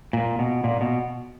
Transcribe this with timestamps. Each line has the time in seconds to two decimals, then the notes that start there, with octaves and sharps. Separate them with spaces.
0.13 A#2
0.39 B2
0.64 A#2
0.81 B2